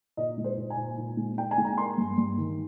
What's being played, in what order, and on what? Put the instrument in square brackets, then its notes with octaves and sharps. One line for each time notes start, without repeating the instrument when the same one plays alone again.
[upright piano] A#2 D#5
G#3
C5
A#2
G#5
A#2
A#2
G#3
G#3 G5
G#5
G#3
A#5
A#3 C6
G2
G2
D#3